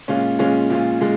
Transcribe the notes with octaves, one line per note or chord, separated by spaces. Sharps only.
A#2 G#3 C#4 F4
A#2 G#3 C#4 F4
A#2 G#3 C#4 F4
A#2 G#3